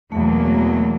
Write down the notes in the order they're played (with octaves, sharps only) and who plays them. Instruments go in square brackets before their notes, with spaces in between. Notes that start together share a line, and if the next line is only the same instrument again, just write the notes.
[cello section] E2 B2 F#3 A#3 [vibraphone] A3